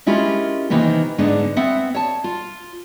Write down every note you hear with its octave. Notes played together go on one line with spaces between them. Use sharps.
G#3 C#4 E4 F4 G4 A#4
C3 D#3 E3 A#3 B3
G#2 D3 G#3 B3 D4
B3 C4 E5 F#5
C#5 A5
F4